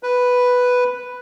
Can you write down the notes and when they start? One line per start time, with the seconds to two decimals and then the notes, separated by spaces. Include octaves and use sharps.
0.03 B4